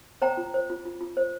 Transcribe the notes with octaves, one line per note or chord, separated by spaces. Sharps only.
C5 G5 A#5
F4
C5
F4
F4
F4
C5